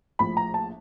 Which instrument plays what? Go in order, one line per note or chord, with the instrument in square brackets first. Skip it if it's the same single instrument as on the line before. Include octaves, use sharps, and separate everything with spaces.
[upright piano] A#1 A2 F3 B5
A#5
A5